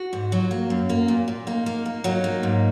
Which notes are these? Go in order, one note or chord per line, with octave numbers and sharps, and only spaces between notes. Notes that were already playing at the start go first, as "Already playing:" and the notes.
Already playing: F#4
G#2
F#3
A#3
F#2
A#3
A#2
A#2
A#3 D#4
A#3
A#3
F#3 D#4
A#3
G#2